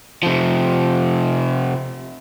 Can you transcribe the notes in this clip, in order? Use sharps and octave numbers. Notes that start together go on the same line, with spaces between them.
C3 F3